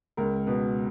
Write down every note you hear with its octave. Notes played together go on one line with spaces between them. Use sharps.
C#2 A#4
B2 B4